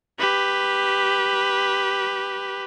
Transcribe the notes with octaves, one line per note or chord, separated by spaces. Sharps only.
G4 B4